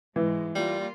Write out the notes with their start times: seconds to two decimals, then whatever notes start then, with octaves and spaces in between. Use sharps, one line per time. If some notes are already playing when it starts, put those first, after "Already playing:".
0.16 G#2 E3 G#3
0.55 G3 A#3 F4